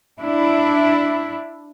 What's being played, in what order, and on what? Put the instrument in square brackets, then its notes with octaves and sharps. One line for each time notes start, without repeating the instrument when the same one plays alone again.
[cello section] D4 E4